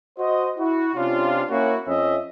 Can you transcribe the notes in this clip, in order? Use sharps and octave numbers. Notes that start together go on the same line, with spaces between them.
F#4 C5 D#5
E4 F#4
C3 C#4 D4 F4
A#3 C#4 E4 F#4
F2 C#4 D#5 E5